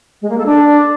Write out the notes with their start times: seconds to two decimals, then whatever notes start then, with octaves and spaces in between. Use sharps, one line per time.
0.22 G#3
0.30 A#3
0.38 A4
0.46 D4